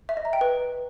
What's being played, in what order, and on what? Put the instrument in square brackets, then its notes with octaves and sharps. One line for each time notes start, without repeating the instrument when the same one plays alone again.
[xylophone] E5
D#5
A#5
G5
B4